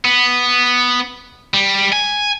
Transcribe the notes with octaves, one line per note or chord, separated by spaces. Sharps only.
B3
G3
G#5